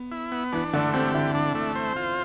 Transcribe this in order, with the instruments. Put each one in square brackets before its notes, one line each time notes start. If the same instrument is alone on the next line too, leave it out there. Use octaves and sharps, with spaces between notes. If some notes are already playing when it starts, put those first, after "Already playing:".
Already playing: [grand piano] B3
[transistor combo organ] E4
B3
[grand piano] E3 [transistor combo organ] D4
[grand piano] D3 [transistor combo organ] A3
[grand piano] C4 [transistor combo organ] G4
[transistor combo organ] D3 [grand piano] E4
[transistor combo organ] D4
A3
C5
F4